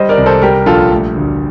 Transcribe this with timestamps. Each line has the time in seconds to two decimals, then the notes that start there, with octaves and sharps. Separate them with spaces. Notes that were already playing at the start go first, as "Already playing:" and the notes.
Already playing: G3 C5 D#5
0.09 A#4 D5
0.17 C2
0.26 A4 C5
0.42 G3 G4 A#4
0.66 A#1 F4 A4
0.92 A3
1.16 D2